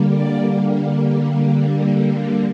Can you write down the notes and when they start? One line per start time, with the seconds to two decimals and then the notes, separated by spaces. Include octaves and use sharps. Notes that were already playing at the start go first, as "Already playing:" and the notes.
Already playing: D3 G3 A#3
0.10 D5